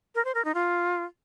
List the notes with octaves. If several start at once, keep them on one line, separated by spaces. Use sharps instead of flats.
A#4
C5
A#4
D#4
F4